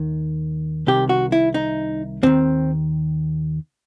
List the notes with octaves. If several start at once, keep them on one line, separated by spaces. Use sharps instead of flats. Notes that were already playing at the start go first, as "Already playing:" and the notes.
Already playing: D#2 D#3
C2 C3 D#3 G4
F#4
E4
D#4
D#2 D#3 C4